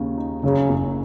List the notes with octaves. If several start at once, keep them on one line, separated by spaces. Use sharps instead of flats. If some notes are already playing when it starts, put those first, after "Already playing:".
Already playing: D#2 C#3
D#4
F#2 C#3
F#1